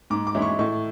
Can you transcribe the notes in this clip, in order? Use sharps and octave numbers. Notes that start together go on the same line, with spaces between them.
G#2 D6
D6
E3 G#3 C#4 E4
C#6
A2 C#6